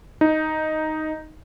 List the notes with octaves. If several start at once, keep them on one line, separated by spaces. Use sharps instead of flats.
D#4